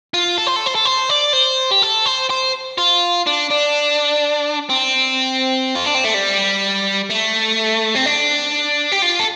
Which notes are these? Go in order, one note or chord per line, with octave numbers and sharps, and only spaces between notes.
F4
A4
C5
A4
C5
A4
C5
D5
C5
G4
A4
C5
C5
F4
D4
D4
C4
F4
D4
C4
A3
G3
A3
C4
D4
G4
F4
A4